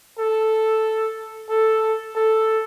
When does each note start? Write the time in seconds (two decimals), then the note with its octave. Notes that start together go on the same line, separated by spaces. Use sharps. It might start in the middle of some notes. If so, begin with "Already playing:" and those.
0.19 A4
1.49 A4
2.15 A4